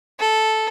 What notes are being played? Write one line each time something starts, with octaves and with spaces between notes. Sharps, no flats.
A4